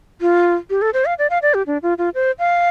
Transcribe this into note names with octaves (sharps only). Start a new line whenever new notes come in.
F4
G4
A4
C5
F5
D5
F5
D5
G4
D4
F4
F4
C5
F5